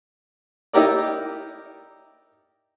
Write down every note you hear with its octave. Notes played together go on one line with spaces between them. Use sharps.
D#4 E4 G4 A#4 D5